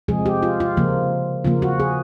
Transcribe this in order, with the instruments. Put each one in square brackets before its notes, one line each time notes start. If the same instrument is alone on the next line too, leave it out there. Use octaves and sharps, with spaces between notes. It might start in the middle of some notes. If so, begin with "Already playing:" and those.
[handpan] C3 F3 G#3 G#4
G4
F4
F4
C#3 F3 A#3
C#3 F3 A#3 F4
F#4
G#4